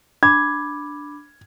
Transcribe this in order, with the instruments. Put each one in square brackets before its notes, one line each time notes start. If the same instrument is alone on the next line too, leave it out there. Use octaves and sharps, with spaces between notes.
[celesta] D4 B5 D6 [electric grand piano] G#6